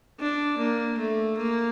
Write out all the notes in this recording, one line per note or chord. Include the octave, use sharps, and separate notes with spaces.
D4
A#3
A3
A#3